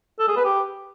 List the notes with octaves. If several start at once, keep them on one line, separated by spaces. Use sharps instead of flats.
A4
G#4
B4
G4